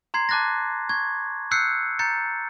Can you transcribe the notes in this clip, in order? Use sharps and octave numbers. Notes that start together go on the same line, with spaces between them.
A#5 C6 G#6 C7
A5 D6 F#6 A6 A#6
C#6 G#6
E6 F#6 G6 C7 C#7
A#5 G6 A6 C#7